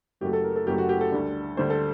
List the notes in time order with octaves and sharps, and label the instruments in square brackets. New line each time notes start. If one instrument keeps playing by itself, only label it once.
[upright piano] F#1 F#2 F#3 A3 G4
A4
A#4
A4
F#1 F#2 F#3 A3 G4
F#4
G4
A4
D2 D3 G3
D2 D3 G3 C5
A4